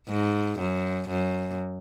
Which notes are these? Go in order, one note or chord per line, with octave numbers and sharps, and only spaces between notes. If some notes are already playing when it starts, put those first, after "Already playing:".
G#2
F#2
F#2